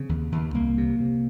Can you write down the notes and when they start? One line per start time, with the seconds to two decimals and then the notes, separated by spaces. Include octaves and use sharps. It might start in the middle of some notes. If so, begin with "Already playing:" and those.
Already playing: C#3 C4
0.09 D#2
0.32 D#2
0.54 C2 A#3
0.78 C3
1.00 C3